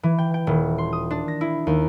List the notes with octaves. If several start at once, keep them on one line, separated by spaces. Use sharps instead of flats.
E3
G5
G5
D#1
C6
D#6
D4
A#6
E4
D#2